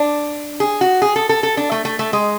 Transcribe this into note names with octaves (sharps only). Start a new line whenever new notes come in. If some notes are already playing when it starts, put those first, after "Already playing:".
Already playing: D4
G#4
F#4
G#4
A4
A4
A4
D4
A3
A3
A3
G#3